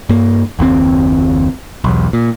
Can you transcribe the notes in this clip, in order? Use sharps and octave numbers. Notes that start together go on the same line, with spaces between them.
G2 A#3
F#1 D#2 C#3 C4
B1 E2
A#2